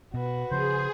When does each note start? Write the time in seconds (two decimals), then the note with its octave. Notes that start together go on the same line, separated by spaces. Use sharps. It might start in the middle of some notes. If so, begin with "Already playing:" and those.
0.14 B2 F#4 B4
0.51 C#3 F3 G#4 C5